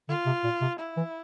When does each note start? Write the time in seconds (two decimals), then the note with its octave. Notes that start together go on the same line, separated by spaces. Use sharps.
0.09 D3 F4
0.26 C3
0.44 A#2
0.61 C3
0.79 E4
0.97 E3